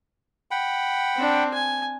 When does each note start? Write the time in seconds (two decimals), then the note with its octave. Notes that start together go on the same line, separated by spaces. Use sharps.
0.51 F#5 G5 B5
1.16 C4 D4
1.54 G#5